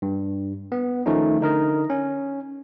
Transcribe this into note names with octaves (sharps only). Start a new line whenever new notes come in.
G2
B3
D#3 F3 A3 C#4 D#4
D3 D#4 A#4 D#5
C#4